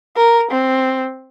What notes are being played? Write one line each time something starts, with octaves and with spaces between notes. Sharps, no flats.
A#4
C4